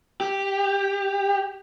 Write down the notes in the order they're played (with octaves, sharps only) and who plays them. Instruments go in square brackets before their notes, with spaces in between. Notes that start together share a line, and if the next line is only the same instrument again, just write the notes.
[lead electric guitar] G4